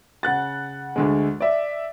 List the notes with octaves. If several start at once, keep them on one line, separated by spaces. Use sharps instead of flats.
C#3 F#5 F#6 A6
D2 D3 G#3
D5 E5